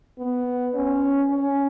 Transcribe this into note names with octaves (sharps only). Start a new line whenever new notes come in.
B3
C#4
C#4